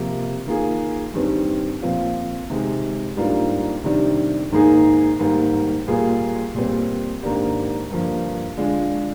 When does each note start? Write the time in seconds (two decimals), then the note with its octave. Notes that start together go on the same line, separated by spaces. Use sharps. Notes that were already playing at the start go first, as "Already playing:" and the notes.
Already playing: C3 F3 A#3
0.47 D#3 A#3 F4 G#4
1.13 G2 D#3 G3 C4
1.82 A#2 F3 C4 F4
2.50 C3 D#3 G#3
3.17 G#2 G3 A#3 D4 F4
3.84 C3 D#3 G3 D4
4.52 G#2 D#3 A#3 D#4 G#4
5.19 G#2 D#3 G3 A#3
5.87 A#2 G3 A#3 F4 G#4
6.55 A#2 G3 C4
7.23 G#2 D#3 A#3 D4 G4
7.90 G2 D3 F3 A#3
8.57 D3 G#3 D4 F4